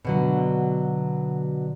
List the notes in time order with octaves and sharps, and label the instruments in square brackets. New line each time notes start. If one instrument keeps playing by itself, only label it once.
[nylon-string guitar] B2 D3 F#3